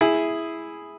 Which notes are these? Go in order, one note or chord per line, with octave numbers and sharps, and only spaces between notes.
E4 G#4